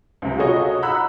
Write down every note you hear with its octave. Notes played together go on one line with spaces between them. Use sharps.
C#2 C3
F4 F#4 G#4 A4 C#5 D#5
F#5 A#5 B5 E6 F#6